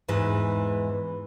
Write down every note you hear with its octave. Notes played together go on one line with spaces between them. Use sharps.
E2 G#2 E3 B4